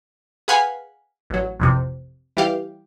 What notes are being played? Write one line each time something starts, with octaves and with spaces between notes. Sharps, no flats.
G#4 B4 F5 F#5 G#5 B5
A1 F#3
A1 F2 C3
E3 G3 G4 F5